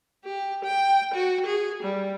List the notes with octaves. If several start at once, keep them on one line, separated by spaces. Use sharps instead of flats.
G4
G5
F#4
G#4
G3